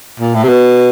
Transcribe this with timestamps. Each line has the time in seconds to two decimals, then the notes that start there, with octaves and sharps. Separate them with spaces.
0.20 A#2
0.34 A2
0.44 C3
0.49 B2